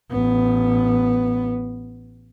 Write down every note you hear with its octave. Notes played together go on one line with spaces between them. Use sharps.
A1 B3